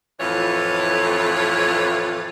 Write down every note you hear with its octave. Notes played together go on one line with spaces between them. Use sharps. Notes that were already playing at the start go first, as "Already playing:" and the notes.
F2 A2 E3 F4 C#5